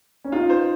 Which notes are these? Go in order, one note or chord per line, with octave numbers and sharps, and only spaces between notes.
C#4
D#4 F4
C5